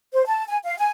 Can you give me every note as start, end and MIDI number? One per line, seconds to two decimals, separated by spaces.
0.13 0.25 72
0.26 0.44 81
0.47 0.58 80
0.64 0.76 77
0.79 0.91 80